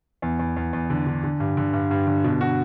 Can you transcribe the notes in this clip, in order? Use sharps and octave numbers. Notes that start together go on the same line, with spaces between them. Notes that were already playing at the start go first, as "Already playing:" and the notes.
E2
E2
E2
E2
D3
D3
D3
G2
D3
G2
G2
D3
B2
F#4